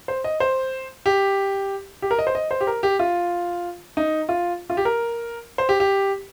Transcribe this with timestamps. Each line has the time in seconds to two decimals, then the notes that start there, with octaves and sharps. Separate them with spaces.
0.08 C5
0.24 D#5
0.40 C5
1.06 G4
2.02 G4
2.11 A#4
2.19 D#5
2.27 C5
2.35 D#5
2.51 C5
2.61 G4
2.67 A#4
2.83 G4
2.99 F4
3.97 D#4
4.29 F4
4.70 F4
4.77 G4
4.85 A#4
5.58 C5
5.69 G4
5.80 G4